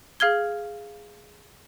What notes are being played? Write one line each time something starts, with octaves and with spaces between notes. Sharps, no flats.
G#4 F5 F6 G#6 G7